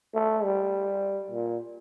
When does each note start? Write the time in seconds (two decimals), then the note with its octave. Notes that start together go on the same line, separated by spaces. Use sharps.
0.15 A3
0.44 G3
1.31 A#2